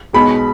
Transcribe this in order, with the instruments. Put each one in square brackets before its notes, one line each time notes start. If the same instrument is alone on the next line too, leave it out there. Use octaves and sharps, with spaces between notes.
[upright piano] B1 B2 G#3 [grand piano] B5